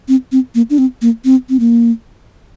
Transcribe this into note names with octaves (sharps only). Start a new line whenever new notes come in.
C4
C4
A#3
D4
C4
A#3
C4
C4
A#3